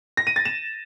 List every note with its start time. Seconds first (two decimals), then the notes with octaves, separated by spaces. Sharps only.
0.17 A#6
0.27 D#7
0.36 A6
0.45 E7